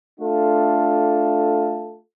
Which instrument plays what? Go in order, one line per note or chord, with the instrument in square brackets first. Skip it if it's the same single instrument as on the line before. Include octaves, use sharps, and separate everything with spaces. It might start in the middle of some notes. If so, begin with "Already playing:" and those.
[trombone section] A3 D4 F4 A4